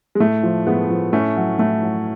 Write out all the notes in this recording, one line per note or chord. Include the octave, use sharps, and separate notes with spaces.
G#3
A2 A3
F3
A2 G#3 B3
F3
A2 A3 C#4
F#3
A2 A3
F#3